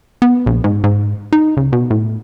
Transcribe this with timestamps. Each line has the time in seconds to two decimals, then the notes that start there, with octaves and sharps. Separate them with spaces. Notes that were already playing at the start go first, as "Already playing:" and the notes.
0.22 B3
0.46 A#1
0.64 G#2
0.84 G#2
1.33 D#4
1.57 C#2
1.73 B2
1.90 A2